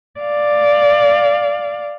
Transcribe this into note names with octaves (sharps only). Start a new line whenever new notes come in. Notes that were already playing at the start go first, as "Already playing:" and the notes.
D5 F5